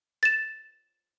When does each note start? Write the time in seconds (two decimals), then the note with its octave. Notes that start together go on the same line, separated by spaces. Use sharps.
0.23 A6 E7